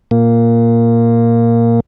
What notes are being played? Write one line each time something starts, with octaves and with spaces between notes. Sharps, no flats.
A#2 A#3